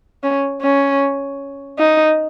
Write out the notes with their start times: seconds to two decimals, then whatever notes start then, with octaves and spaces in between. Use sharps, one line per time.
0.23 C#4
0.62 C#4
1.78 D#4